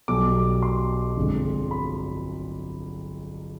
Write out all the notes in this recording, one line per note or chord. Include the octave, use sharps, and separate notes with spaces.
B1 B2 G3 D6
C6
G1 F2 D3 G#3
B5